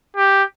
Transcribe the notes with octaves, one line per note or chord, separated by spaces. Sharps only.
G4